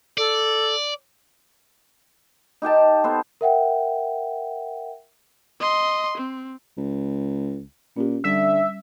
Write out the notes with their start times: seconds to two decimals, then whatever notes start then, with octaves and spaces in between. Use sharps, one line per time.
0.18 A4 D5
2.62 D#4 G4 G5 A5
3.04 B3 A4 C5
3.41 A#4 E5 F#5 G5
5.60 D#5 C6
6.18 C4
6.77 C#2
7.96 A#2 C#4 G4
8.24 D3 G3 E5